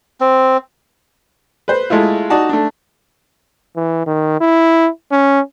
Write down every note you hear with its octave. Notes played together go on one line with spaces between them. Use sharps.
C4
B4 C5
G#3 A3 E4 F4
D#4 F#4 D5 A5
A3 D4
E3
D#3
E4
C#4